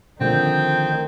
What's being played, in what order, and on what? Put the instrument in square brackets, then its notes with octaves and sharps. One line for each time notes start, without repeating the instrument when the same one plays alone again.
[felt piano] D3 F3 A3 [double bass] D#3 [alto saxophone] C4 [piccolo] G6